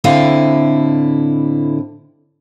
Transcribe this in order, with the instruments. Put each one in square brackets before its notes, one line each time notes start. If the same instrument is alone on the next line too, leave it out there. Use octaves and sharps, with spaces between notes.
[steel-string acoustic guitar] A2 D3 C4 E4 D#5 F5